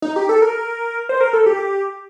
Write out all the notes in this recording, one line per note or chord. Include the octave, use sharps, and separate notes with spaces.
D#4
G4
A4
A#4
C5
A#4
A4
G4